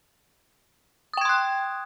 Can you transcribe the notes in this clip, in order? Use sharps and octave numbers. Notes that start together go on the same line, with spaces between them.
G5 C6 D#6 F#6 G#6